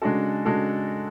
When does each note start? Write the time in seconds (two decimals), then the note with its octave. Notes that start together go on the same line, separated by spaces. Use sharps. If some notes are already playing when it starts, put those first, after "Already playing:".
0.02 C#3 G#3 D4 F#4 A4
0.45 C#3 G#3 D4 F#4 A4